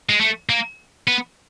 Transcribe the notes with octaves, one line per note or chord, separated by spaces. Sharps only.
G#3
A3
A#3
B3